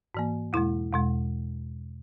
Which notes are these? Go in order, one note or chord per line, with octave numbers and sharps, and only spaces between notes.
G#2 E3 A#3
E2 B2 G#3 E4
E2 B2 G#3